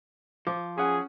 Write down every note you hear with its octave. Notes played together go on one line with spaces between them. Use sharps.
F3 D6
C#4 G#4 F#5